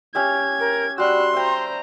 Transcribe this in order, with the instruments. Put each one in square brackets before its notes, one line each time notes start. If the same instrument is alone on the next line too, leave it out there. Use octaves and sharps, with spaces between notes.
[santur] C#4 G4 E5 [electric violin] G#6
[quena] A#4
[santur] G3 F#4 [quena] C6 [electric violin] E6 F#6
[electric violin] C5 A#5 [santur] E5 G5